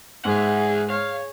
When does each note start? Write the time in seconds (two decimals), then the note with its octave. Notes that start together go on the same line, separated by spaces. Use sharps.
0.25 G#2 G#4 E5 F#5
0.90 C#5 F5